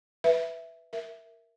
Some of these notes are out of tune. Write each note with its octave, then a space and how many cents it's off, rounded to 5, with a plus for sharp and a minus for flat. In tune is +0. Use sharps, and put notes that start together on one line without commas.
B4 +0 E5 +0
A#4 +0 E5 +0